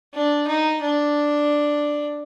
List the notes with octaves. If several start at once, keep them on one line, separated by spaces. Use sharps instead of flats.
D4
D#4
D4